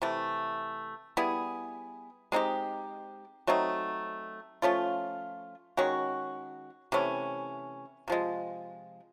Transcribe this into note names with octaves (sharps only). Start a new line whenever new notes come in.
C3 E3 A3
G3 B3 E4 G#4
G#3 C4 D#4 G4
F#3 A3 C4 D#4
F3 A3 C#4 F4
D#3 G#3 C#4 F#4
C3 E3 A3 C#4
C3 F3 G#3